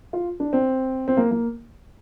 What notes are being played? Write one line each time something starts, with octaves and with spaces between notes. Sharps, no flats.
F4
D4
C4
C4
A#3
A#3